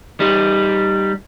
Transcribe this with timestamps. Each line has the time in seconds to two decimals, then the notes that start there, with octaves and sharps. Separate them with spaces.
0.20 G3 D#4